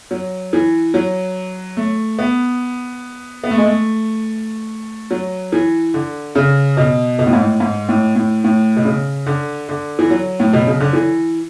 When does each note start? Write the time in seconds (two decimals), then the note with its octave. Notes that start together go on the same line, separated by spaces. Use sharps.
0.11 F#3
0.53 E3
0.94 F#3
1.77 A3
2.19 B3
3.44 B3
3.51 A3
3.58 G#3
3.66 A3
5.10 F#3
5.52 E3
5.94 D3
6.35 C#3
6.77 B2
7.19 B2
7.27 A2
7.33 G#2
7.40 A2
7.60 G#2
7.89 A2
8.16 A2
8.44 A2
8.77 B2
8.85 C#3
9.26 D3
9.69 D3
9.99 E3
10.10 F#3
10.40 A2
10.53 B2
10.67 C#3
10.80 D3
10.93 E3